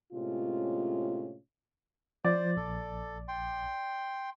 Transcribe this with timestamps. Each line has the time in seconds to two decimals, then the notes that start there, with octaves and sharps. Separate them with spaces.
0.13 A2 C3 G#3 C#4 F4
2.25 F3 C5 D5
2.57 A#1 A4
3.28 G5 C6